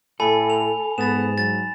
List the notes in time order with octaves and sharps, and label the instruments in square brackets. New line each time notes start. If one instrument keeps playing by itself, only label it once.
[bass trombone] A2 [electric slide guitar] A4 [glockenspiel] G#5 B5
[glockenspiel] F7
[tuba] G#2 [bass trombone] B3 [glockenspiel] A6 E7
[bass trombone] F#3 [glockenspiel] A6